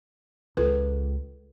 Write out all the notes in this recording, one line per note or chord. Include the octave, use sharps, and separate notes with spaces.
C#2 F4 A4 B4